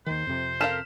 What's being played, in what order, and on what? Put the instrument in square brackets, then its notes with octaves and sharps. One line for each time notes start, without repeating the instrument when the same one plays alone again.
[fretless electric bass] D#2 D#3 [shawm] C5
[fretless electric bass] F2 C3
[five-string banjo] A4 A#4 F5 [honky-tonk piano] F6 B6 E7